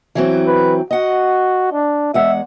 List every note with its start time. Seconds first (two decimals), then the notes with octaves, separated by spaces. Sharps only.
0.15 E3 F#3 C4
0.47 B4
0.91 F#4 D#5 F#5
1.73 D4
2.14 E2 G#3 E5 F#5